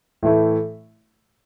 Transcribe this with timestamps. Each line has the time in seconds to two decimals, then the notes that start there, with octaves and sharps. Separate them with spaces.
0.23 A2 E3 A3 E4